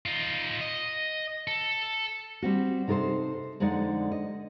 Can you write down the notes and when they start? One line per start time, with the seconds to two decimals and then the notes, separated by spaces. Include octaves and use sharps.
0.06 D#4 F4
0.61 D#5
1.47 A4
2.42 G3 C4 F#4
2.88 C3 D#4 A4 A#4 C5
3.60 F2 D3 G#3 D#4 D5 F#5
4.12 D#5